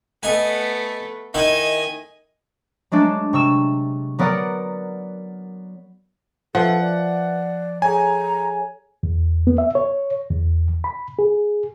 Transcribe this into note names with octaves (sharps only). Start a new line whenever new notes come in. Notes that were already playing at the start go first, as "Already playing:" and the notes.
A3 B3 D#5 G#5
D#3 D#4 E4 D#5 G#5
F#3 G#3 A3 D4
C3 C#6 E6 E7
F#3 B3 A#4 D5 F#5
F3 A4 B4 E5 F#5
D5
G#4 A4 C#5 G#5 A#5
E2
B3
E5
C#5
E2
B5
G#4